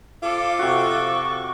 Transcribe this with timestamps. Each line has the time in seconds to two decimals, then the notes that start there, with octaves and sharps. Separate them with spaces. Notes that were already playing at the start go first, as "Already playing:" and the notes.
0.23 F2 F4 A4 D6
0.59 C3 F#4 C#6